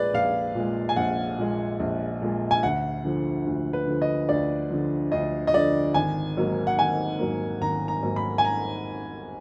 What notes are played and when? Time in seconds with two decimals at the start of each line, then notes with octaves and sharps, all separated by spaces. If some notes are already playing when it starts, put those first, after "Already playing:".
Already playing: A#1 A#2 G#3 G#4 B4 D5
0.13 A#1 F5
0.55 A#2 G#3
0.89 G#5
0.96 A#1 F#5
1.38 A#2 G#3
1.80 A#1
2.22 A#2 G#3
2.51 G#5
2.63 D2 F#5
3.05 D3 F3
3.46 D2
3.73 B4
3.87 D3 F3
4.02 D#5
4.29 D2 D5
4.70 D3 F3
5.12 D2 D#5
5.47 D#5
5.53 D3 F3 D5
5.94 G#1 G#5
6.37 G#2 F#3 A#3
6.67 F#5
6.79 G#1 G#5
7.19 G#2 F#3 A#3
7.60 G#1 A#5
7.88 A#5
8.03 G#2 F#3 A#3
8.16 B5
8.38 G#5
8.45 A#5